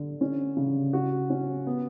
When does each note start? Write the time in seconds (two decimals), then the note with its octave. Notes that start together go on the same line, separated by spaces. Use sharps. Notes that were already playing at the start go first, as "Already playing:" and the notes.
Already playing: D3
0.21 C#4
0.57 C#3
0.93 F#4
1.30 C#4
1.67 B3